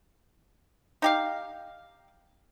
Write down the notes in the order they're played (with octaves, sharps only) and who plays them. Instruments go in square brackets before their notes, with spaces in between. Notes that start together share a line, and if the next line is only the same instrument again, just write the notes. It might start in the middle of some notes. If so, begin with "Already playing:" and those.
[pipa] D#4 G4 F5